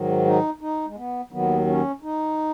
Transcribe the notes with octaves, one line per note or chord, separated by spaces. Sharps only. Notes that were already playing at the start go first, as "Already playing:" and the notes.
Already playing: G#2 D#3 F#3
D#4
D#4
G#3
B3
D#2 D#3 F#3 B3
C#4
D#4